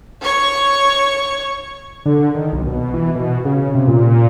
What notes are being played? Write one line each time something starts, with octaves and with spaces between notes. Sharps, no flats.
C#5 C#6
D3
D#3
B1
B2
E3
B2
C#3
C3
A#2